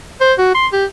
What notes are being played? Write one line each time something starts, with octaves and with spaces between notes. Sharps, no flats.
C5
F#4
C6
G4